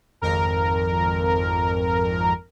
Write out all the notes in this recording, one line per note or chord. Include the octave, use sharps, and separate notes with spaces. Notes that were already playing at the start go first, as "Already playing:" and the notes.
G#1 F2 A#4